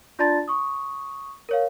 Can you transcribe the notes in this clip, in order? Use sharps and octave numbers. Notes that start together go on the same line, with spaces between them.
D4 F4 D5 A5 C6 A6
C#6 D#6
A#4 C#5 F5